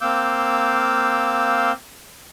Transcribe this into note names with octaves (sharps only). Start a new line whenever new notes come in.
A#3 C4 F5 D6 E6 G6